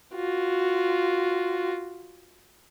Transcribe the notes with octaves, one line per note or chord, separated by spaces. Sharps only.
F4 F#4